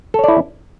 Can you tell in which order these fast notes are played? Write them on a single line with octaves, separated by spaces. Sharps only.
A4 C#5 D5 E4